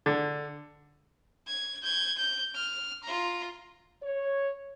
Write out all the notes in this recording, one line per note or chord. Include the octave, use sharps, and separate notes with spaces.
D3
G#6
G6 G#6
G6
F6
F4 A#5
C#5